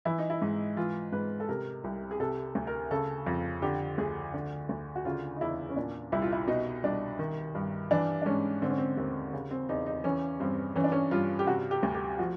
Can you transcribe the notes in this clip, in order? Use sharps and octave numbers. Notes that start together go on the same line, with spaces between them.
E3 E4
D#4
E4
G#2
E3 F4
G#2 B4
A4
C3 A#4
C2
G#4
C3 A4
D2
A#4
C#3 A4
F2
D3 G4
D2 G#4
D3
D2
F#4
C#3 F4
D#4
E2 E4
C#4
A#2 D4
C2 E4
F4
E4
B2 D#4
C2 D4
D#3
G2
E3 D4
D4
G#2 C#4
D3 C4
C#4
C4
D#2 C4
C#3
C4
E2 D#4
D#4
E3 C#4
G2 C4
E3 C#4
D4
C#4
G2 F4
G4
C3 F#4
G4
D2
G4
F3 F#4